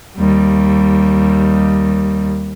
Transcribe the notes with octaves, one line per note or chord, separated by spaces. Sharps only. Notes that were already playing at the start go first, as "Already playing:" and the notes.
D#2 G3